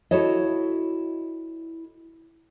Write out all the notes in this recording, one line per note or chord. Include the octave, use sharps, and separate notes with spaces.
E4 F#4 A4 C#5 D#5